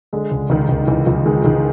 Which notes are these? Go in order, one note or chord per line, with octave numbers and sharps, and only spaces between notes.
D3 G#3
C#2
C#2 D#3
C#2
C#2 E3
C#2 F3
D#3 G#3
C#2 D#3